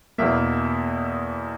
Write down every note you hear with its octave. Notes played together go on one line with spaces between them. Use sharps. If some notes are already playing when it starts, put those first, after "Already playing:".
E2 B2 A#3 E5